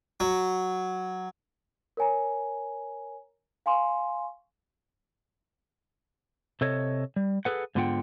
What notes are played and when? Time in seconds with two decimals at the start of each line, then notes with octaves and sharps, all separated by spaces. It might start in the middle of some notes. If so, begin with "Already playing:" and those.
0.20 F#3
1.97 A#4 C#5 G#5 A#5
3.66 F5 G#5 C6 C#6
6.61 C3 A4 C#5 D#5
7.16 G3
7.45 G#4 A4 B4 F#5
7.75 G#2 D3 B3 F4 F#5 G5